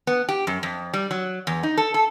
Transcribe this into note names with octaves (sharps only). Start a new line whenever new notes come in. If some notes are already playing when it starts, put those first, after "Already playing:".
B3
G4
F#2
F2
G3
F#3
E2
D#4
A4
A4